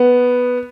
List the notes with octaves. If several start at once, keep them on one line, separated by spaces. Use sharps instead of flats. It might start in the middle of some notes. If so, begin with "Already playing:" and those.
Already playing: B3